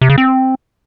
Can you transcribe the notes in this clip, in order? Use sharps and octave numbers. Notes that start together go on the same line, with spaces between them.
C3
C#3
C4